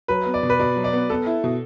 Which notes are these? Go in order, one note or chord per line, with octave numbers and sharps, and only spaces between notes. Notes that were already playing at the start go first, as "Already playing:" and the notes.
F#3 B4
B3
D5
B2
B4
B2 D5
F#3
D5
B3
B3 A4
E4
B2